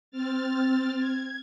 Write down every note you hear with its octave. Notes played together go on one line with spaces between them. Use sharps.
C4 F6 A6
G#6